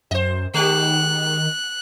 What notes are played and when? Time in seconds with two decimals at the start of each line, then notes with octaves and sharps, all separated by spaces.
0.11 F#2 C5 D#5
0.54 D#3 G#3 G4 F#6